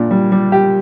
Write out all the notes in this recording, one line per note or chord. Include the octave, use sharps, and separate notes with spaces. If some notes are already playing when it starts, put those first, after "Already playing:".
Already playing: A#2 D4
G3
G3
G4